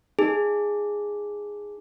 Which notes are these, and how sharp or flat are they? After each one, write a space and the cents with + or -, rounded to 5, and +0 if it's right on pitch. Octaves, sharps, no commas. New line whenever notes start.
D#4 +0 G#4 -5